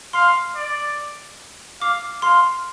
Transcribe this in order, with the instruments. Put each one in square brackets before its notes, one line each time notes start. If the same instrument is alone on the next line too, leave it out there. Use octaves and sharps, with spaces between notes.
[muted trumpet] F5 [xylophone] C6
[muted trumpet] D5
[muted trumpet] F5 [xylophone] D6
[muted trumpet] F5 [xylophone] C6